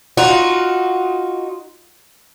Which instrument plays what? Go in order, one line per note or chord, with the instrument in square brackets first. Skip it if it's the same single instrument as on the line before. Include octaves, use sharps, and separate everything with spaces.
[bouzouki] D#4 F4 F#4